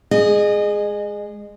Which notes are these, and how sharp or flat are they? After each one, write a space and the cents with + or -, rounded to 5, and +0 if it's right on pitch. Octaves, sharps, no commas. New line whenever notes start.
G#3 +0 G#4 +0 D#5 -30